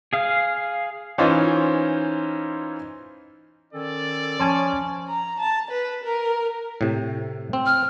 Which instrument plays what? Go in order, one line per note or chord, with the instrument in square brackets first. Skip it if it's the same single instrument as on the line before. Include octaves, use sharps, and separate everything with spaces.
[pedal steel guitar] G#4 F5
[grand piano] E3 C#4 D#4 F4 C5
[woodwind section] D#3 C#4 A4 [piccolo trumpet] D5
[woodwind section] F3 [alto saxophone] C#4 [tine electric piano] G#5 A5 C6
[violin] A#5
A5
B4
A#4
[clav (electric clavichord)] A2 C3
C4
[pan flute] F6